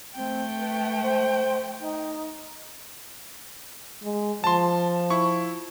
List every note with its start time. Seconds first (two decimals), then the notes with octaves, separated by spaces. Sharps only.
0.15 A3 C4 G5
0.58 B4
1.02 C5
1.80 D#4
4.03 G#3
4.44 F3 A5 C6
5.10 E4 C#6